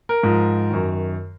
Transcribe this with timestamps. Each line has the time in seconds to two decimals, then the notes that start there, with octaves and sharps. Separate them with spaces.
0.09 A#4
0.23 G#2 F3
0.70 F#2 D#3